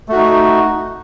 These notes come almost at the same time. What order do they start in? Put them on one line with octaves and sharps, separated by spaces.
A3 F#4 D#4